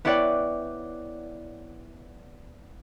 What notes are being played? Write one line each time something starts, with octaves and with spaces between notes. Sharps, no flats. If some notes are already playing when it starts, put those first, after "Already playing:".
B3 E4 C#5 D5 F#5 G5